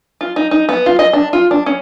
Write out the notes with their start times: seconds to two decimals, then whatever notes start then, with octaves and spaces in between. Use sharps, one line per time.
0.21 F4
0.36 D#4
0.51 D#4
0.69 B3
0.86 F4
0.99 D#5
1.13 D4
1.33 F4
1.51 D4
1.66 C#4